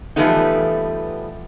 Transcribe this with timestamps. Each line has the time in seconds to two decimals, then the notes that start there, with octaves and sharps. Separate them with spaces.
0.16 E3 F3 G3 A3 B3 D#4